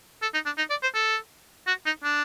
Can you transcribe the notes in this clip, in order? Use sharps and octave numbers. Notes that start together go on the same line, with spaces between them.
A4
D#4
D4
D#4
D5
C5
A4
F#4
D#4
D4